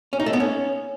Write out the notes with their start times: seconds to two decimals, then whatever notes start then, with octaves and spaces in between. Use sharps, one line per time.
0.13 C#4
0.20 D#4
0.26 A3
0.33 B3
0.40 C#4